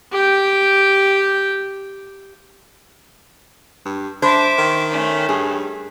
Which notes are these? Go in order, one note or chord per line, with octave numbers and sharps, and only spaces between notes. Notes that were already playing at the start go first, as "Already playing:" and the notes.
G4 G5
G2
D4 C5 E5 D6
D#3
A3 C#4
G2 G#4